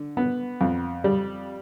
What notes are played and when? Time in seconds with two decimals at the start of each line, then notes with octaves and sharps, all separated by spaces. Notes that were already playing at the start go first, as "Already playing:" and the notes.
Already playing: D3
0.17 B3
0.61 F2
1.04 G3